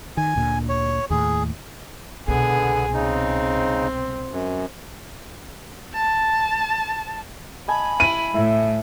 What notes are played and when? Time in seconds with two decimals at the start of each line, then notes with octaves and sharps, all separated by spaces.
0.17 D#3 G#5
0.36 D2 A#2 D3
0.69 C#5
1.10 D#2 A2 G#4
2.28 C2 B2 D3 B3 G#4
2.94 C#3 C4 D#4
4.31 F#2
5.94 A5
7.68 D#5 G#5 A5 B5
8.00 E4 D#7
8.34 A2 E4